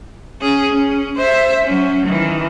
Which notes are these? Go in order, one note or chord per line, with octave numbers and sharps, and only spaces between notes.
C#4 G#4
C#4
C5 E5
F#3 C#4
D#3 E3